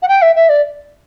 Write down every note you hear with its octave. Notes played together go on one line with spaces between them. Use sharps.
F#5
G5
E5
E5
D5